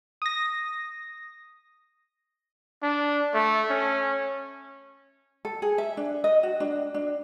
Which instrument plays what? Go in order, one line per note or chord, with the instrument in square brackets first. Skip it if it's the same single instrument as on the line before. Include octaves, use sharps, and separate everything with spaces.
[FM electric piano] D#6 A#6
[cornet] D4
A3
C#4
[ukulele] A4
G#4
E5
D4
D#5
F#4
D4
D4